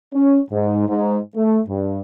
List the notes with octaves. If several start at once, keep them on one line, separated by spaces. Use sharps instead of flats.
C#4
G#2
G#2
A3
G2